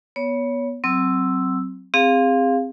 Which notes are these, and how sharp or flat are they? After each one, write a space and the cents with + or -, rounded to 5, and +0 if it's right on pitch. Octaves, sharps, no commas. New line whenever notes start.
B3 -20 C#5 +20
F#3 +20 C4 +0 E6 +0
C4 +0 G#4 -35 F5 +0